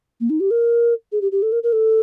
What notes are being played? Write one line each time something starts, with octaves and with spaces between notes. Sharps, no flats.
A#3
D#4
G4
A#4
G#4
G4
G4
A4
A#4
A#4
A4